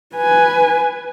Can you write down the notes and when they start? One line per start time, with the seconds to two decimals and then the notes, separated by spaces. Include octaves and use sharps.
0.16 B4 G#5